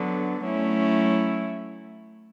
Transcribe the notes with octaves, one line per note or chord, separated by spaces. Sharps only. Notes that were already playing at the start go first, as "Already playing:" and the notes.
Already playing: D3 F#3 B3 D4
F#3 A3 C#4 E4